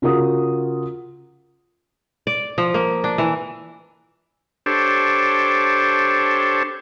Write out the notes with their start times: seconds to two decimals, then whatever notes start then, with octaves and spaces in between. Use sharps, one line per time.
0.02 C#3 F4 F#4 A#4 D#6
2.27 D5
2.58 F3
2.74 A#3
3.04 D4
3.18 E3
4.66 D4 G4 A4 C5 C#5